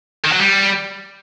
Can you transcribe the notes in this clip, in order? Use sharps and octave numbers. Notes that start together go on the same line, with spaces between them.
D#3
F#3
G3